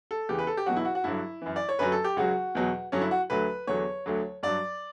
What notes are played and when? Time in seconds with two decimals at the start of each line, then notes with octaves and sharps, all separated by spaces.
0.11 A4
0.29 E2 C#3 E3 G4
0.39 B4
0.47 A4
0.57 G4
0.66 E2 B2 F#3 F#4
0.76 E4
0.85 F#4
0.95 F#4
1.04 G2 D3 F#3 E4
1.42 F#2 E3
1.56 D5
1.69 C#5
1.79 F#2 D3 F#3 B4
1.92 A4
2.04 G4
2.17 C#2 C#3 F#3 F#4
2.55 E2 B2 F#3
2.92 G2 D3 F#3 C#4
3.01 E4
3.11 F#4
3.30 D2 D3 F#3 B4
3.67 E2 D3 F#3 C#5
4.06 D2 D3 F#3
4.43 G2 F#3 D5